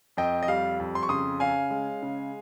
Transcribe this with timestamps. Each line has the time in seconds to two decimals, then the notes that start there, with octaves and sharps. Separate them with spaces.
0.17 F2 D#5 G5
0.43 D#5
0.48 G3 F5
0.80 F2
0.95 C6
1.03 C#6
1.09 C#3 C6 D#6
1.40 C#4 F5 G#5
1.71 G#3
2.02 C#3